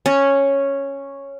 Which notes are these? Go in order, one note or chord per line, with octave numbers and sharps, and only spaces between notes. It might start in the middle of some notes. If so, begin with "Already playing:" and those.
C#4